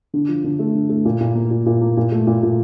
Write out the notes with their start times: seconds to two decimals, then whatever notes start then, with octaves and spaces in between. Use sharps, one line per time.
0.14 D3
0.28 F3
0.44 D3
0.59 A3
0.75 D3
0.89 A3
1.05 A#2
1.21 A#2
1.35 A#3
1.51 A#2
1.66 A#2
1.81 A#3
1.97 A#2
2.12 A3
2.27 A#2
2.43 A#2